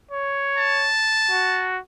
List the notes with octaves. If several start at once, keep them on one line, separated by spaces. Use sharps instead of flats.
C#5
A5
F#4